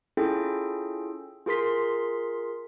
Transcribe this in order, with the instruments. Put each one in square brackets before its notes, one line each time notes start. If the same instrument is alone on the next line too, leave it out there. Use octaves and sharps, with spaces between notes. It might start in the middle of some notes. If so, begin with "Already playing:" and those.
[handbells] C#4 E4 F4 G#4 A4 G5
F4 G#4 A#4 C6 B6